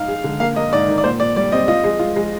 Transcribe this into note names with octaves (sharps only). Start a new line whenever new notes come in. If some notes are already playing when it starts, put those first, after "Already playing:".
Already playing: D#4 F5
G#3
D3
A#3 F5
A#3 D#5
G#2 D5
D#3
D5
A#2 C5
A#2 D5
G3 D5
C4 D#5
F4 D#5
G#3
F4
G#3